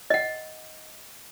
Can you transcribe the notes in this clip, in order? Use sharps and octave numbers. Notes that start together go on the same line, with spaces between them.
D#5 F#5